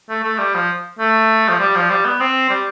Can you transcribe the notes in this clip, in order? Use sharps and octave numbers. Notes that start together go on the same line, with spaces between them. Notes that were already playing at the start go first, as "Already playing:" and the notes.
A3
A3
G3
F3
A3
F3
G3
F3
G3
B3
C4
G3